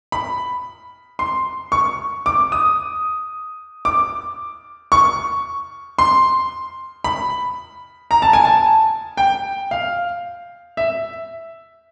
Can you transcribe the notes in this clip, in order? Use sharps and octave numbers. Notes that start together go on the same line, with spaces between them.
B5
C6
C#6
D6
D#6
D6
C#6
C6
B5
A#5
A5
G#5
A5
G5
F5
E5